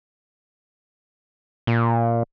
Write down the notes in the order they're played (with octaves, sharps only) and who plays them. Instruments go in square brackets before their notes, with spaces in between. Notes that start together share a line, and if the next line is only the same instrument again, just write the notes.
[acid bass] A#2